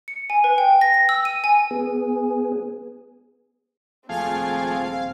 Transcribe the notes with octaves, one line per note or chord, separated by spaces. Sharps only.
C#7
G#5
B4
G5
A#6
A#6
E6
D#7
G#5
B3 G#4
D#1 F3 A3 C4 G#4 F5